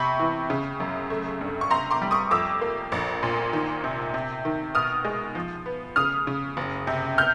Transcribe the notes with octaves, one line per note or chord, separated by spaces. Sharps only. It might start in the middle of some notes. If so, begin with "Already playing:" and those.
Already playing: C3 B5 C#6
E3
C#3
F#2
A3
G2
C#6
C3 A#5 C6
C6 D6
G3
C#6 D#6
F2 D6 E6
A#3
A#1
A#2
D#3
C3
C3
D#3
B2 D#6 F6
G#3
F3
B3
C#3 D#6 F6
C#3
F#1
C3
F6 G6